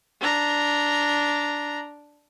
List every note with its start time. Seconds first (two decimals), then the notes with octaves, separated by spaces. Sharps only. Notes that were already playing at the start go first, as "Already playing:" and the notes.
0.21 D4 A#5